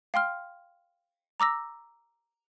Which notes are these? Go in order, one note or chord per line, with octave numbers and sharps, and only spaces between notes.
F5 G5 C6 F6
A#5 D6 E6 A#6